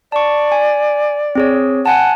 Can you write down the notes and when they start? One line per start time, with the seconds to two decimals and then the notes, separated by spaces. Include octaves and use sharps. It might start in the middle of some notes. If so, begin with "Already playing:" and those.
0.12 D5 A5 C#6
0.52 G#5
1.35 C4 G#4 C#5
1.86 F#5 G#5 A5